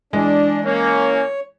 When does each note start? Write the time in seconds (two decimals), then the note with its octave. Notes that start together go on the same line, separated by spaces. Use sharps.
0.13 E3 G#3 D4
0.66 A#3 C#4 C#5